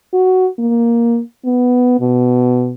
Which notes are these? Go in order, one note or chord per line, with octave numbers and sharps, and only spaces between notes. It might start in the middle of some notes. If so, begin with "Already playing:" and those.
F#4
A#3
B3
B2